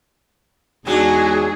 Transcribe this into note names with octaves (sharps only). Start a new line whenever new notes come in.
E2 F#3 G#3 D4 D#4 F#4 G#4